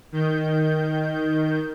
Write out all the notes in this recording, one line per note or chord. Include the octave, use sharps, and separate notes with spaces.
D#3 G6